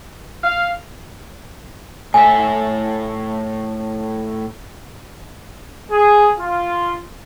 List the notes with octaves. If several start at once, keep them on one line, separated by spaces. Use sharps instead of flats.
F5
A2 E5 G#5
G#4
F4